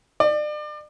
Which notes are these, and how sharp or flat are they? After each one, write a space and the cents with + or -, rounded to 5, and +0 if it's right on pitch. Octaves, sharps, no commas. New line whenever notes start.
D5 +35